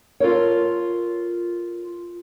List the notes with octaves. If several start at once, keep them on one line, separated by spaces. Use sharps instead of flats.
F4 A4 A#4 C#5